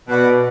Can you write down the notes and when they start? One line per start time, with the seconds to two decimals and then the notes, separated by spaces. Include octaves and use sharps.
0.08 B2 B3 F#4 B4 D5 F#5